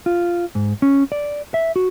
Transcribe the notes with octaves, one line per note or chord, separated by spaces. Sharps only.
F4
G#2
C#4
D5
E5
F#4